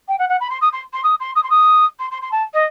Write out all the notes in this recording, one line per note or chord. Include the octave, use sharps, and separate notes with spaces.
G5
F#5
F#5
B5
C6
D#6
C6
C6
D#6
C6
D#6
C6
D#6
C6
C6
C6
A5
D#5